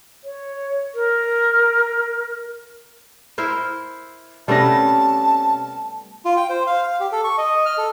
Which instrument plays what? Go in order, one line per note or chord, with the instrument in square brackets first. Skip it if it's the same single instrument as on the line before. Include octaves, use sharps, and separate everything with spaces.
[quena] C#5
A#4
[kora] E4 A#4 C5
[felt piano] C3 C#4 A#6 [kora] G3 A3 B3 [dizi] A5
[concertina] F4
G5
C5
F5
F5
G4
A4
C#6
D#5
F6
A4